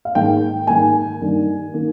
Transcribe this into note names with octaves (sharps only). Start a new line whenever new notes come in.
F5
G#2 D#3 A#3 G5
G#2 D#3 A#3 G#5
G2 D#3 A#3
D#3 A#3